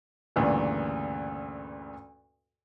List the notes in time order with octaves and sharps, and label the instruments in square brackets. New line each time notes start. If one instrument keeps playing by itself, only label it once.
[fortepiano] D2 G2 A#2 C#3 E3